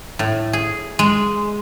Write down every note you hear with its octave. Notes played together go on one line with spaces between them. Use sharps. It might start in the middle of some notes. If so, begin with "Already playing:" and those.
A2
G#4
G#3